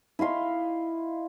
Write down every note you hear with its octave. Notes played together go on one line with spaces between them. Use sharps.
E4 D#5 F5 C6